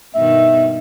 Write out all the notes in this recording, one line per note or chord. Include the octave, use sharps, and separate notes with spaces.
G2 B2 D#3 E5